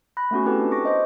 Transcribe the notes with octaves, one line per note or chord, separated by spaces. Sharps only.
B5 F#6 A#6
A3 B3 C#4 F#4
C4 E4 F#4 G4 A4 B4
D4
C#6 D6 A#6
C5 D#5